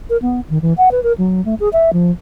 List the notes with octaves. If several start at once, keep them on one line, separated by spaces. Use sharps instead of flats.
A#4
B3
D#3
E3
F#5
B4
A#4
F#3
A3
G#4
E5
F3